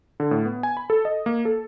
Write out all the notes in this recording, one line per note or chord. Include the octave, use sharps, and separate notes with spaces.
D3
A2
B3
G#5
B5
A4
D#5
A#3
A4